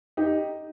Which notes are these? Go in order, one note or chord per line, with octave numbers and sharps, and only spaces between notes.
D#4 G4